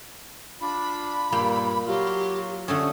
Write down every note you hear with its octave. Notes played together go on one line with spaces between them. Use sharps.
D4 F4 B5
G2 A#2 A#3 G5
F#3 F4 G4
D3 A3 C#4 D#6